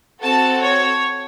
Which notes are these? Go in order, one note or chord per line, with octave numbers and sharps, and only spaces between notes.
C4 F#4 A4 A5
C#5